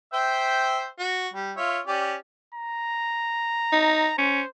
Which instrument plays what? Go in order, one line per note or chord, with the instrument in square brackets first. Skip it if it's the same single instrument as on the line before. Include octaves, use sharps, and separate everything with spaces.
[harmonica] C5 E5 G5
F#4
G3
F4 C#5 E5
C#4 G4 D5
[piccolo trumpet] A#5
[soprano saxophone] D#4
[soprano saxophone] C#4 [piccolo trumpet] C5